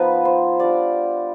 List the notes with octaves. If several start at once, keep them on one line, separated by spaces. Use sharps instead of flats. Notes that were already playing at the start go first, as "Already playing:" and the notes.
Already playing: F3 B3 D#4 B4
C5
G3 D4 F4 D5